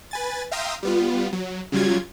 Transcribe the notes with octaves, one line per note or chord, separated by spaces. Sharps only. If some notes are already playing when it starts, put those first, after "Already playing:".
B4 G#5 A6
E5 F5 G5 A#5 C6 D#6
G3 B3 F4
F#3
C#3 F#3 G3 F4 G#6